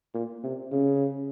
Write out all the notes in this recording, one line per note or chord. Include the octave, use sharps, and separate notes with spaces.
A#2
C3
C#3